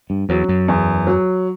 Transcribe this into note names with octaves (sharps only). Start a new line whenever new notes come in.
G2
E2 F#3
F#2
E2
F#3